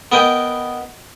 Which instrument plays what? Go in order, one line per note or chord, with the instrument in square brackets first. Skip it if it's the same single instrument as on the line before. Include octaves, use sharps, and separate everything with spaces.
[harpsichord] B3 A#4 D#5 G5